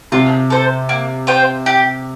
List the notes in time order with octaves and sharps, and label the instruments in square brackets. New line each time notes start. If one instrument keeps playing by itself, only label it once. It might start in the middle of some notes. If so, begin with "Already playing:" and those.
[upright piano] C3 [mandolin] F4
[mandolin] A4 C5
A#3
F4 C5 G5
G4